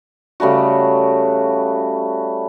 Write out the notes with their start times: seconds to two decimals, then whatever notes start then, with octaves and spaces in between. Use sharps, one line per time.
0.40 C#3 G3 A3 F#4